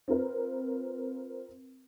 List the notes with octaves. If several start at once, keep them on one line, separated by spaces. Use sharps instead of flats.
C4 F4 A#4 B4